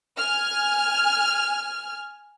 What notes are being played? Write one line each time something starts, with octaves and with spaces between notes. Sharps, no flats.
G#5 F6